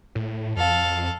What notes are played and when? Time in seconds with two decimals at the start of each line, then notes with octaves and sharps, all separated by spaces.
0.15 A2
0.56 F2 A4 F5